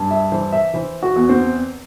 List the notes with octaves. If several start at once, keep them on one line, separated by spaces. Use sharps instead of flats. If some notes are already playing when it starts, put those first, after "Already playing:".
Already playing: G2
E5
E3 C5
E5
E3 C5
F#4
E2
C4